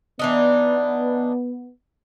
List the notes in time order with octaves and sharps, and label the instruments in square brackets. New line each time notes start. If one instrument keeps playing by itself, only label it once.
[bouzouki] E3 D4 D#4 [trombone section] B3